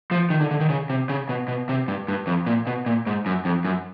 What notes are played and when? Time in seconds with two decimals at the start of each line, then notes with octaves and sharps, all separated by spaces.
0.11 F3
0.30 D#3
0.41 D3
0.51 D3
0.61 D#3
0.70 C#3
0.90 C3
1.09 C#3
1.29 B2
1.48 B2
1.69 C3
1.88 G2
2.08 G2
2.27 F2
2.47 A#2
2.67 B2
2.86 A#2
3.07 G#2
3.26 F#2
3.45 F2
3.65 F#2